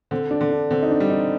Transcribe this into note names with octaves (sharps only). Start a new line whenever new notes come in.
D3 C4
D4
D3
D4
D3 C4
D#4
D4
G3
D#4